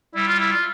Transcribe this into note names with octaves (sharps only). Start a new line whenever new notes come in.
G3 E4
F4
E4
F4